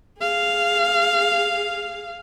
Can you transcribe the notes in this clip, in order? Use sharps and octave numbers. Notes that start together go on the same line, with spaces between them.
G#4 F5